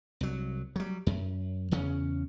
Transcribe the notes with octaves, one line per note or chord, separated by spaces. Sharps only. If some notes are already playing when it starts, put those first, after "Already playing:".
C2 F#3
F#3 G3
F#2
E2 C#3 C#4